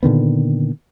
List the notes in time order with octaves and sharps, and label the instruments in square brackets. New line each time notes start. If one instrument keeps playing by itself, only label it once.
[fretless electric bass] A#2 D3 D#3 B3